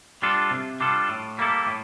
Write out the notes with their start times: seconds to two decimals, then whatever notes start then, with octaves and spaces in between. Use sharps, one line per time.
0.22 G3 D4 F4 A4
0.51 C3
0.80 G3 D4 F4 A4
1.09 A2
1.38 G3 A#3 E4 A4
1.67 A2